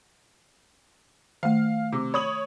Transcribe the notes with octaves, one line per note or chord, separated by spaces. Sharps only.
D#3 A3 F5
C3 D6
C#5 B5 D#6 F#7